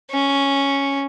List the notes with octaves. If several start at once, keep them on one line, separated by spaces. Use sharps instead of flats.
C#4